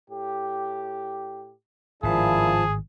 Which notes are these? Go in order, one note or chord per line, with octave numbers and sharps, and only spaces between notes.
A2 G4
G#1 A2 F3 A#3 D4 E4 G#4 A5